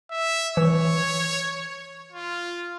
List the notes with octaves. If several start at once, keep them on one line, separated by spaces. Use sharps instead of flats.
E5
E3 C#5
F4